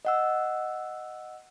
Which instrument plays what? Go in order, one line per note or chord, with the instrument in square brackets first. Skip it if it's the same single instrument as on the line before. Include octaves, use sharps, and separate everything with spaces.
[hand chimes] D#5 F#5 E6